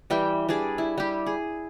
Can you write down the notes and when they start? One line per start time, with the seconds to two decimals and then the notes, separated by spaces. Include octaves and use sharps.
0.10 E3 G3 E5 G5
0.49 G3 D4 G#4 D5
0.78 E4
0.98 G3 G4
1.26 G#4